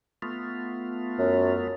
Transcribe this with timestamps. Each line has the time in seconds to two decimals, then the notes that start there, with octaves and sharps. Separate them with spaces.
0.22 A3 B3 F4
1.19 F#2